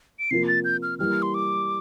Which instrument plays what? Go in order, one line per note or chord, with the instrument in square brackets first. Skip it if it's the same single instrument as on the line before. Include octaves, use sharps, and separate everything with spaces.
[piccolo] D7
[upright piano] C3 F3 A#3 F4 [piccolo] C7
[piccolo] A6
G6
F6
[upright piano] E3 G3 A#3 E4 [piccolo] F6
[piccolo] C6
D6